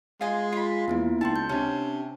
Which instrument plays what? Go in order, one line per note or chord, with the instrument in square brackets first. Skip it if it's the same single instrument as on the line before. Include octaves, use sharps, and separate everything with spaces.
[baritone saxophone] G#3 [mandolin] F4 D#5 G#5
[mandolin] F4 B5
[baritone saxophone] E2 [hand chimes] A#3 B3 E4
[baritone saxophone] C#2 [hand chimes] D#4 G5 C6 [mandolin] A5
[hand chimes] G6
[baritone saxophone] C3 [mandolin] C#4 [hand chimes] D4 A5